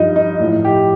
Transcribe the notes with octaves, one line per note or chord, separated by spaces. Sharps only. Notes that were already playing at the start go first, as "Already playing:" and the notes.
Already playing: G2 F3 D#4
D#4
A2 F3
G4